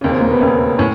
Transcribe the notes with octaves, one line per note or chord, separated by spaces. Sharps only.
E1 D#2 C#3
C4
A#3
B3
E1 D#2 C#3
A2 C#4